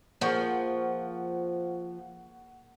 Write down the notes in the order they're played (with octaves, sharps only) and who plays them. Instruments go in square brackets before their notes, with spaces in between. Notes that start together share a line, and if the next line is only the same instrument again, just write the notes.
[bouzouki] F3 [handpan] A#3 G#4 [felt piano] F#5 C#6 C#7